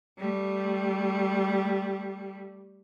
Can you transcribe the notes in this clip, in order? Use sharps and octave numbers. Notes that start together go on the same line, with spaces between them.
G3 A3